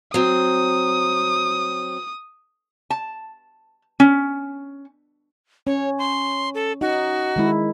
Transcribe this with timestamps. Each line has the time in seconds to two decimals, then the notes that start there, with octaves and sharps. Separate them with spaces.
0.14 F#3 C4 D#6
2.90 A5
4.00 C#4
5.67 C#4 C#5
5.99 C6
6.54 A4
6.81 D#4 F#4
7.36 D#3 G#3 E4